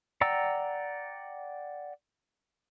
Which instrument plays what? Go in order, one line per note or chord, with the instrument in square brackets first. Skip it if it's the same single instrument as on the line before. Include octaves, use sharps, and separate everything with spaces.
[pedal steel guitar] D5 F#5 G5 A#5 E6